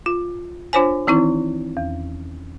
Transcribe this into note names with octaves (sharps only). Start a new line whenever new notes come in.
F4
D4 F4 C5 C#5 G#5
D#3 E3 C4 D#4 E4
E2